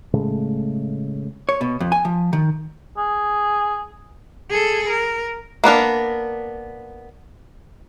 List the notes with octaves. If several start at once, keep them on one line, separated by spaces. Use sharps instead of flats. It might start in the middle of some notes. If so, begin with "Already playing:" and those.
A2 C#3 G#3 A3
C#5
B2
F2
G#5
F3
D#3
G#4
G#4 A4
A#4
A#3 B3 D4 A#4